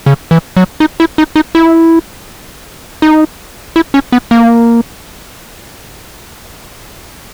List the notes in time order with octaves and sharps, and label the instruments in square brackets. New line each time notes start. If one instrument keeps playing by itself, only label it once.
[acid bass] C#3
E3
F#3
D#4
E4
D#4
D#4
E4
D#4
E4
C#4
B3
A#3